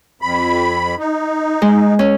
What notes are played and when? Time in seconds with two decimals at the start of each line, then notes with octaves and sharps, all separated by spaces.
0.22 F2 B5
0.99 D#4
1.62 G#3
1.99 C#4